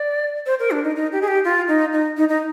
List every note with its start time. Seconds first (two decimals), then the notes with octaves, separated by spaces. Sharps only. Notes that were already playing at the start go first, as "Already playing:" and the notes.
Already playing: D5
0.46 C5
0.60 A#4
0.71 D4
0.84 D#4
0.96 D#4
1.12 G4
1.22 G#4
1.28 G4
1.45 F4
1.68 D#4
1.93 D#4
2.17 D#4
2.29 D#4